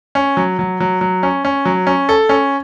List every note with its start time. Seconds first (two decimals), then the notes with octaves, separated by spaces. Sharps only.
0.15 C#4
0.37 F#3
0.59 F#3
0.80 F#3
1.01 F#3
1.23 C#4
1.45 C#4
1.65 F#3
1.87 C#4
2.09 A4
2.29 C#4